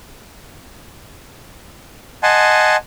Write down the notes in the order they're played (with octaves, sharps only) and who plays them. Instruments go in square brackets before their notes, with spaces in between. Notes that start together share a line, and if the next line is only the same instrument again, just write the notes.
[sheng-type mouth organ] D#5 F#5 G#5 A5 C6